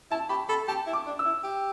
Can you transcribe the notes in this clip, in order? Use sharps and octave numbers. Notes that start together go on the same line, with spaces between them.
E4 A5
G4 B5
A4 B5
G4 A5
E4
D6
D4
E6
E4
G4